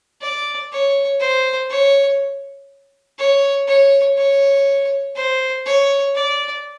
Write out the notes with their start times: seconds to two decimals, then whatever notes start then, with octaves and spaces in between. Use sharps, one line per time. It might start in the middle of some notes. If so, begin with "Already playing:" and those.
0.21 D5
0.72 C#5
1.20 C5
1.70 C#5
3.19 C#5
3.67 C#5
4.17 C#5
5.16 C5
5.66 C#5
6.15 D5